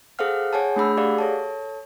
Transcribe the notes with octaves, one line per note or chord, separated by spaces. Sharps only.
G#4 A4 C5 F5 F#5 F6
G#4 C#5 F#5 G#5 A5
A3 D4 G#4 B5 E6
G4 G#4 D5 F5 F#5
A4 C#5 A5